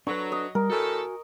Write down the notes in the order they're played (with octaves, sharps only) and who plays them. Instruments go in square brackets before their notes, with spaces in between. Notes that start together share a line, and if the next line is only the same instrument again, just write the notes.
[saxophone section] F#3 [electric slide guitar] D4 A4 B4 [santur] C#6
[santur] D#5
[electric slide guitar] G3 [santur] A#4
[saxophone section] A2 D#3 A4 [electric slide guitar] F#4 G#5